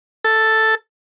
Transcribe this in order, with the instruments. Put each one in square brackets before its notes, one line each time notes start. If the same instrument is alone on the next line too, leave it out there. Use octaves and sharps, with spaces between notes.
[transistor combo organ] A4